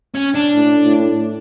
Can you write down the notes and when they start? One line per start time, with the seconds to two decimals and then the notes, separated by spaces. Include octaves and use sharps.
0.14 C#4
0.34 D4
0.54 A2
0.85 A2